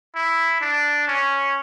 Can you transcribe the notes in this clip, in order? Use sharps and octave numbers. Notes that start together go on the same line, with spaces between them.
E4
D4
C#4